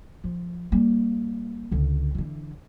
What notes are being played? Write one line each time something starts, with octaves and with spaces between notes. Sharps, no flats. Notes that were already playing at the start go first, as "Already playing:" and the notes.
F3
G3 A#3
C#2 D3
D3 E3